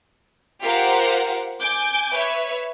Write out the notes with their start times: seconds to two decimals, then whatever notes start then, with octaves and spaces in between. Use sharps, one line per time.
0.61 F4 G4 A#4 C5 F5 F#5
1.60 G#5 D6 G6
2.13 B4 C#5 E5